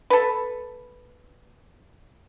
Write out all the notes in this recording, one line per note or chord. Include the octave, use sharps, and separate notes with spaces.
A4 B4